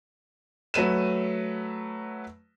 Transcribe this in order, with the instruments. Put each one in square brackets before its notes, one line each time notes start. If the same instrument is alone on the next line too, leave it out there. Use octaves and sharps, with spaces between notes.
[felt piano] F#3 A3 B4 D#7 E7